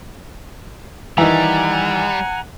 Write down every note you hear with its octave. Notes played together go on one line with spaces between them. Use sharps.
D#3 E3 G3 F#5 G#5 A#5